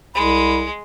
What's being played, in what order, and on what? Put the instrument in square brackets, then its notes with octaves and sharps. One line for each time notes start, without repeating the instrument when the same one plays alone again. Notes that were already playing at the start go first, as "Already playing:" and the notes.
[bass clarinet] C2 [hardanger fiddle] G#3 [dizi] B5